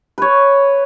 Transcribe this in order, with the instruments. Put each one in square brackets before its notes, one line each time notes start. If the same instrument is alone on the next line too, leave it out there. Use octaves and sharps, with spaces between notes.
[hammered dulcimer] B4 C#5